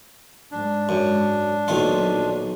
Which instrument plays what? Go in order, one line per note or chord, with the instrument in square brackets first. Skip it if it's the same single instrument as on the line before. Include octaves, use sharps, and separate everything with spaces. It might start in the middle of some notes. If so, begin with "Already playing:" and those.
[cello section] G#2 [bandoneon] D4
[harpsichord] F#2
[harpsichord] B1 D#3 F4 [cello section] A#2 F#3